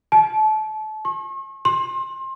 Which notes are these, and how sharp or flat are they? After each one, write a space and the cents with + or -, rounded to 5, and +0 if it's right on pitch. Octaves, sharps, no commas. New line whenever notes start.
A5 -30
C#6 -45
C6 +30